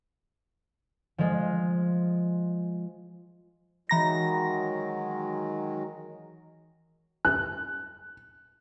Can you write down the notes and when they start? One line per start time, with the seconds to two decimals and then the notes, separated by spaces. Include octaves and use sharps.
1.18 F3 G#3
3.89 D#3 E3 F#3 G#3 A#5 A#6
7.25 F#6